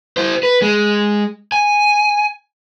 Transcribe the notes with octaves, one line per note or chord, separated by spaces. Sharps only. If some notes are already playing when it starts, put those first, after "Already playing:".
E4 C5
B4
G#3
G#5